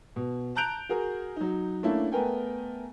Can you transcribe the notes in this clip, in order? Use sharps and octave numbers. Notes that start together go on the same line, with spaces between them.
B2
A5 A#5 F#6 G6 D7 F7
F#4 G#4 A#4
F#3 D#4
A3 A#3 C#4 D4 E4
A3 B3 A#4 G5 G#5